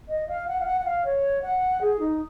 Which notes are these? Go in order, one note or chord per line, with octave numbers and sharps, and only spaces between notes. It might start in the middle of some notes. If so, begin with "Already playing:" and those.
D#5
F5
F#5
F5
F#5
F#5
F5
C#5
F#5
G#4
D#4